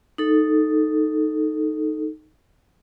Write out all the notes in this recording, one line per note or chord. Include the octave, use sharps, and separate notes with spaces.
D#4 A4